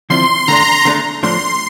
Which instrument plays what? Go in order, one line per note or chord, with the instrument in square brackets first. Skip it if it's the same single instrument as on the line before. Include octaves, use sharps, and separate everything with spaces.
[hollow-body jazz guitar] D3 F3 C4 E4 [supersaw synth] C6
[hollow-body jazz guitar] D3 A3 D4 [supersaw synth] A#5
[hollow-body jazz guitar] D3 A3 D4 A4
[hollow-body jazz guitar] A2 F3 A3 D4 [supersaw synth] C6